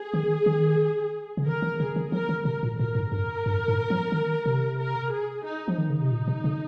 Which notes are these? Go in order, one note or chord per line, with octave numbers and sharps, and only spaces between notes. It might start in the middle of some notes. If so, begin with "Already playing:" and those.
Already playing: G#4
D#3
D#3
C#3
D#3 A#4
D#3
C#3 G#4
D#3
F3 A#4
D#3
C3 A#4
A#2
A#2 A#4
G#2
G2 A#4
G2
G#2
F3
D#3
C3
A#4
G#4
D#4
F3
D#3 D#4
C#3
C3
A#2
C3
C#3